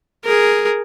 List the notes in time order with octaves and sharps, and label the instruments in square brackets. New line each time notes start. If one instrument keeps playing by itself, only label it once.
[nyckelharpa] G#4 A#4